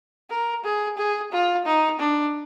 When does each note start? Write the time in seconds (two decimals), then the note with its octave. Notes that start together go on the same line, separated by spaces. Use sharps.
0.30 A#4
0.64 G#4
0.97 G#4
1.32 F4
1.66 D#4
1.99 D4